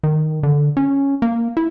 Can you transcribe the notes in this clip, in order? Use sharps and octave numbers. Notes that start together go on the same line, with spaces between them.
D#3
D3
C#4
A#3
E4